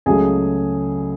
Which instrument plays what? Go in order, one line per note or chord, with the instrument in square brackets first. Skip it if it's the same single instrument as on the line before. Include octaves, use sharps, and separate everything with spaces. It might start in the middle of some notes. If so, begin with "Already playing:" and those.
[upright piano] C#2 C#3 F#3 A3 G#4 G#5